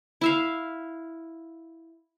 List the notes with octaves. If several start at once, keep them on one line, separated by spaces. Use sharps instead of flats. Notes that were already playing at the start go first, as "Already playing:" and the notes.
E4 E5 F5